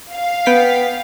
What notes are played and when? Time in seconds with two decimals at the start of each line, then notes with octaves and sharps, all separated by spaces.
0.13 F5
0.46 B3 G5 B6